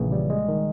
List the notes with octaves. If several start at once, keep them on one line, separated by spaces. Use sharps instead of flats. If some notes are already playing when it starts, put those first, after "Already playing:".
Already playing: A#1 A#2 C#3 E3
G3
G#3
D#3